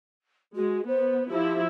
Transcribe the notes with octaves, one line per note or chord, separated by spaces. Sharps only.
G#3 F#4
B3 C5
F3 E4 G4